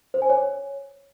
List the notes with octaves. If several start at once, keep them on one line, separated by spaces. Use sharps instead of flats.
C5
G#5
C#5